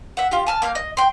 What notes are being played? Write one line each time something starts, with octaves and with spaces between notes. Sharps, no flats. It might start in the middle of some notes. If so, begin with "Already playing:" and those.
E5 F#5
F4 G4
G#5 A5 F6
A#3 E5 F5 G6
D#5
G5 C6